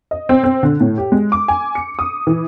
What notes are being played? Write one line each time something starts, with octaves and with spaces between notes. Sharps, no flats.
D#5
C4
C4
D3
A2
G4
G#3
D6
G#5
C#7
D#6
E3